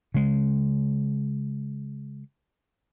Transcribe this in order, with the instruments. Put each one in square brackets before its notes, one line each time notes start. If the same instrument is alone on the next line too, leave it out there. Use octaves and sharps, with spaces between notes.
[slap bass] C#3 G#3